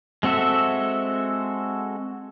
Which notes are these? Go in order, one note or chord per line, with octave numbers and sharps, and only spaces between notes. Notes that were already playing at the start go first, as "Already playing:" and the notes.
G#3 C4 F#4 A4 E5